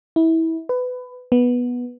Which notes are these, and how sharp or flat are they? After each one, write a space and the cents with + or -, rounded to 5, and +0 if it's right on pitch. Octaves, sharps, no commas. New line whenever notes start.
E4 -25
B4 +20
B3 -10